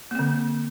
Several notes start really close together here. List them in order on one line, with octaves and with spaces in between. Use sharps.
A#3 C4 D3